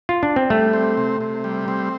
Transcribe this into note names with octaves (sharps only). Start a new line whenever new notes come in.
F4
D4
C4
G3 A3
C4
C3
C3
G3
C4